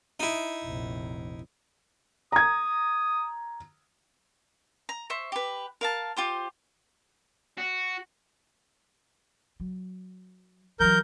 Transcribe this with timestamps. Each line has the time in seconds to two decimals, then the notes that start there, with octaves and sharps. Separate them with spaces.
0.20 D#4 E4
0.65 F1 A#1
2.32 A#5 D#6 G#6
4.89 A#5
5.10 C5 E5 C#6
5.32 G4 B4
5.81 A#4 F5 A5
6.17 F4 G4 C5
7.58 F#4
9.60 F#3
10.80 E3 F#3 A#4 G6